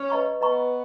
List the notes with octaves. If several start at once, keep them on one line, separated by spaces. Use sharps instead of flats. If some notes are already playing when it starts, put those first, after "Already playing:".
Already playing: C#4
B4 D#5 A#5 C#6
B3 B4 D#5 A#5 C#6